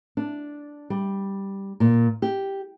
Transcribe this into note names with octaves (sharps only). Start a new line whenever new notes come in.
D4
G3
A#2
G4